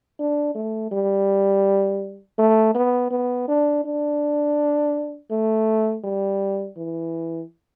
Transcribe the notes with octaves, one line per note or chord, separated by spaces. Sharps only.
D4
A3
G3
A3
B3
B3
D4
D4
A3
G3
E3